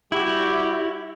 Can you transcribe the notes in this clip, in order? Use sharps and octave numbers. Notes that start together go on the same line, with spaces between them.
G3 E4 F#4 G4